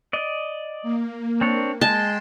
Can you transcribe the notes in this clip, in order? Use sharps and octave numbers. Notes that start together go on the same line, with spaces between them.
D5 D#5
A#3
C4 D4 C#5
G#3 G5 A5 C6